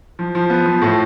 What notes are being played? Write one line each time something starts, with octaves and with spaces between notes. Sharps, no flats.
F3
F3
B3
F3
A2